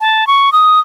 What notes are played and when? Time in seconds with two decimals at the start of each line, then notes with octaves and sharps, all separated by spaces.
0.01 A5
0.27 C#6
0.52 D#6